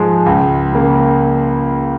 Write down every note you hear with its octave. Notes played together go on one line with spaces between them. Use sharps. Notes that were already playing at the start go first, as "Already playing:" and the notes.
Already playing: G#2 F3 G#3
C#2
C#3 A#3